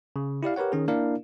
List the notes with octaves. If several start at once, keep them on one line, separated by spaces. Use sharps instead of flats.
C#3
E4 G4 D5 F5
G4 A#4 B4 C#5 F#5
D#3 C#4 G#4
A#3 D4 E4 A#4 D5 F5